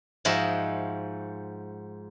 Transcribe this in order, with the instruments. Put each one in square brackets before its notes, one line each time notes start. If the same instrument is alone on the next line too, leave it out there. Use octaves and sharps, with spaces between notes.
[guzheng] G#2 F3 F#4 D#5 E5